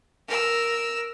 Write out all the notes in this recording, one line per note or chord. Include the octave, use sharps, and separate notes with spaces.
A#4 E6